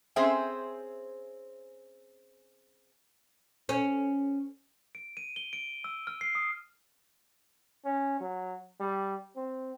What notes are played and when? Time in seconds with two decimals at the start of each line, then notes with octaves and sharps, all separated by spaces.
0.16 C4 C#4 G#4 C5 E5 G5
3.69 C#4
4.95 D7
5.17 D#7
5.36 G7
5.53 D7
5.84 E6
6.07 F6
6.21 C7
6.35 D#6
7.85 C#4
8.21 F#3
8.80 G3
9.36 C4